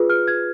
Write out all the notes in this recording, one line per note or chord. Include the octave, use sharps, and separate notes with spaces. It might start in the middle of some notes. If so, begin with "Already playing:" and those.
Already playing: F4 G#4 B4
F6
G#6